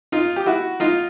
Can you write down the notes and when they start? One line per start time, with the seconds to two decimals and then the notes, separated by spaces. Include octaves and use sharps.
0.12 D#4 F4
0.36 G4
0.46 E4 F#4
0.80 D#4 F4